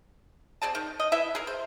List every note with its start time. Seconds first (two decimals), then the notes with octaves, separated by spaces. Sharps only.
0.62 C4 G#4 D5 A5
0.75 D#3
1.00 D#5
1.12 E4 B4 E5
1.35 G#4 A#4
1.47 C5